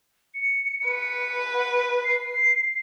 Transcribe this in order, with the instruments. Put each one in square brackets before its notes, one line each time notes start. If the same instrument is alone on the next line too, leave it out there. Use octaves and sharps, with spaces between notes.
[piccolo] C#7
[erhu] B4
[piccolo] F#5
C7